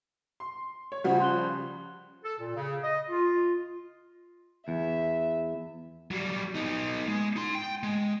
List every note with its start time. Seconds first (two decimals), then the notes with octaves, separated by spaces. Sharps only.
0.40 C6
0.92 C#5
1.04 C#3 F3 G3 C5 F#5
1.20 C6 F#6 G7
2.24 A4
2.39 A#2
2.56 C#3
2.84 D#5
3.09 F4
4.68 E2 E5
6.11 F#3 G3
6.55 B3 D#4
7.08 G#3
7.36 D#4 C6
7.55 G5
7.83 G#3